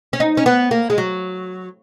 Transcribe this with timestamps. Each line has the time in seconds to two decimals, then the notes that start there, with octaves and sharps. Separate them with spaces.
0.13 C#4
0.20 D#4
0.37 C#4
0.46 B3
0.71 A#3
0.90 G#3
0.98 F#3